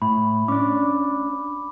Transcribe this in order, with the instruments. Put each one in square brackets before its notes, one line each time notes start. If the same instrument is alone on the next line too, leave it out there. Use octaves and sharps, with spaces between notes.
[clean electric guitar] A2 [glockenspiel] B5
[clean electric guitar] C#4 D4 [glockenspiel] D6